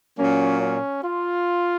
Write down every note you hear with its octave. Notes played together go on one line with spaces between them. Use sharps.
A#2 F#3 A#3 C#4
C#4
F4